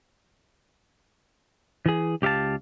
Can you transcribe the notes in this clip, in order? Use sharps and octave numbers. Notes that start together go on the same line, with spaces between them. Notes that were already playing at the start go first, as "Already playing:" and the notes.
E3 G#4
C#2 G4 E5 F5 A5